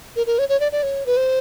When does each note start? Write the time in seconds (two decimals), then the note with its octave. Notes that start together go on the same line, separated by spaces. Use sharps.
0.16 A#4
0.27 A#4
0.39 C#5
0.49 C#5
0.60 D5
0.72 D5
0.83 C#5
1.06 B4
1.17 C5